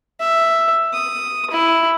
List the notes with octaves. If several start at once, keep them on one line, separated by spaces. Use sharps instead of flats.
E5
D#6
E4